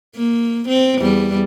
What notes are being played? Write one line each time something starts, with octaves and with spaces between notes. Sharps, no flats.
A#3
C4
E2 G3